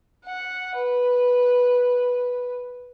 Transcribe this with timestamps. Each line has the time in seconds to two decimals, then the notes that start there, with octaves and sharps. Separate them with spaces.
0.24 F#5
0.75 B4